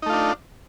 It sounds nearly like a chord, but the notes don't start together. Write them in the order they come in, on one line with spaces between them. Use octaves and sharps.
D#4 A3 F4 D4